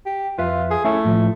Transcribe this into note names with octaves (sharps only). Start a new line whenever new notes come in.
G4
F2 F4 B4 E5
G#4
A3 C#4 E4
A2 F3